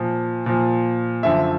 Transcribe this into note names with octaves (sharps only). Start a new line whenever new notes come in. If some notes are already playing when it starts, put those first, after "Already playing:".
Already playing: A#2 F3
A#2 F3
F#2 D3 F3 E5